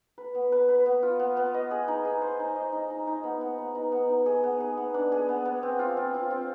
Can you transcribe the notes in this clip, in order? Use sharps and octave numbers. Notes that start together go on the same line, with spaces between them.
B4
B3
B4
B4
B3
F4
B3
B3
D#5
G#4
D#4
G#4
C5
D#4
D#5
D#4
D#4
D#4
B3
B3
B3
D#4
B3
D#4
G#4
B3
G#4
B3
D4
G#4
B3
B3
C4
F4
C4
F4
C4